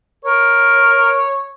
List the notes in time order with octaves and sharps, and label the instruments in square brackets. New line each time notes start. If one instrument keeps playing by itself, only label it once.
[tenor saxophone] A#4 [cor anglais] C#5